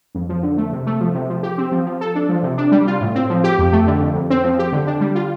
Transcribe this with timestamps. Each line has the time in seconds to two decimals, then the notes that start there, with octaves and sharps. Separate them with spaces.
0.15 F2
0.29 F3
0.43 D3
0.57 A3
0.72 C3
0.87 A3
1.00 F3
1.15 C3
1.30 F3
1.43 G4
1.58 C4
1.72 F3
1.86 F3
2.01 A4
2.15 D4
2.29 F3
2.43 C3
2.58 D4
2.72 G3
2.87 F4
3.01 A2
3.15 C4
3.30 F3
3.44 G4
3.59 F2
3.72 A3
3.87 D3
4.01 F2
4.15 F2
4.30 C4
4.43 F3
4.59 G4
4.73 D3
4.87 D4
5.01 G3
5.15 F4